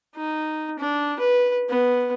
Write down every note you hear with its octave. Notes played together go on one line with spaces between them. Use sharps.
D#4
D4
B4
B3